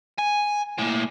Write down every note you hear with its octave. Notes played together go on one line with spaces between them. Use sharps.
G#5
A2 A#3